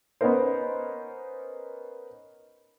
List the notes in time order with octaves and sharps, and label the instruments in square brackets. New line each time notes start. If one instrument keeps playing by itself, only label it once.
[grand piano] B3 C#4 D#4 A#4 C5